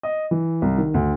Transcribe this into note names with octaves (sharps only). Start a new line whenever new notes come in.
D#5
E3
C2
D#3
D2